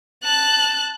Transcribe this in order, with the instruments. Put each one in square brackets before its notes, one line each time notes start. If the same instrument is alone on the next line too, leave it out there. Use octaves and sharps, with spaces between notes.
[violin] A5 F#6